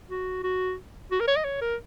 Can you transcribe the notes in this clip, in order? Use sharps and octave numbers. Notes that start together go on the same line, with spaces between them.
F#4
F#4
F#4
A#4
C#5
D#5
C#5
A#4